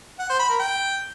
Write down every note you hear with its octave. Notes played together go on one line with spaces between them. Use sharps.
F#5
C5
B5
A#4
G5